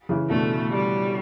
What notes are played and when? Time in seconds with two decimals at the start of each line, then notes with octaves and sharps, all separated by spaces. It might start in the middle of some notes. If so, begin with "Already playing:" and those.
0.09 C#3 E3
0.30 B2 D3 A3
0.71 G3